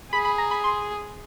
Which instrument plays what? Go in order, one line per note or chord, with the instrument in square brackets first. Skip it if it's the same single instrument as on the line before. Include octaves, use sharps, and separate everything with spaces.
[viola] G#4 [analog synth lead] B5
[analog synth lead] B5
A#5
B5
C6